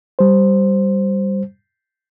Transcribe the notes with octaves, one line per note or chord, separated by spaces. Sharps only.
G3 C5